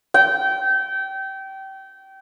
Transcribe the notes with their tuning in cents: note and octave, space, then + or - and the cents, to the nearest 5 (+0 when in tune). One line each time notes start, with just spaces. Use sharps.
G5 -25